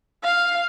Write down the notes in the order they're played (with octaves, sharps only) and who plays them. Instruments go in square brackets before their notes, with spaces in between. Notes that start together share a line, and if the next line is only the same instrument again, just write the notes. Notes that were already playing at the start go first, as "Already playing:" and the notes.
[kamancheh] F5